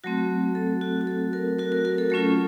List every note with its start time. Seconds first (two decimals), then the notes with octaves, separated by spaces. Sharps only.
0.04 F#3 A3 C4 F#4
0.55 A4
0.81 F#4
1.01 F#4
1.07 A4
1.33 F#4 A#4
1.59 F#4 A#4
1.72 F#4 A#4
1.85 F#4 A#4
1.98 A4
2.10 F#3 A3 C#4 F4 A4